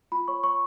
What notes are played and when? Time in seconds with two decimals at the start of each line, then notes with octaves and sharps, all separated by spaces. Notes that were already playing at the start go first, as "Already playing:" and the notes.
0.12 F4 B5
0.28 C#5 C#6
0.43 C#5 C#6